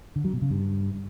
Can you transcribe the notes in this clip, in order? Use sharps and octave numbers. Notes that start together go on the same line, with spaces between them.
D3
F#3
B2
C#3
G2